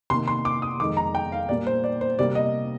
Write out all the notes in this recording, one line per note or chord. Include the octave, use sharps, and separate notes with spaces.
C3 D#3 A#3 C6
C6
D6
D#6
F2 D#3 G#3 D6
A#5
G5
F5
A#2 G3 A#3 D5
C5
D5
C5
C3 G3 A#3 D5
D#5